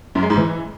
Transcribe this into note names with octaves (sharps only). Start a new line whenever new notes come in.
F#2
G#3
G#2
E3